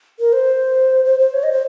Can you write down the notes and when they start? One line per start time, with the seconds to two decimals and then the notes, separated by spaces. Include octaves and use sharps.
0.20 A#4
0.33 C5
1.05 C5
1.19 C5
1.33 C#5
1.43 D#5
1.52 C5